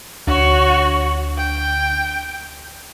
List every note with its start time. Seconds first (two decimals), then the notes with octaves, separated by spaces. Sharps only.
0.27 D2 F#4 C#5
1.37 G5